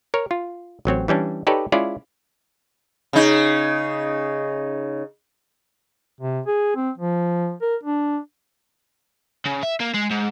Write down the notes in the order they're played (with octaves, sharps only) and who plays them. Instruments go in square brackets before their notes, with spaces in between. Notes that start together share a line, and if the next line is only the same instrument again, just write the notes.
[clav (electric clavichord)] A#4 C#5
F4
A1 F#3 C4 C#5
E3 G3 C#4 D4
D#4 G4 A4 B4 C#5 D5
G#3 C#4 E4 F4 D5
[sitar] C#3 D#4
[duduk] C3
G#4
C4
F3
A#4
D4
[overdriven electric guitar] C#3
E5
A#3
G#3
G#2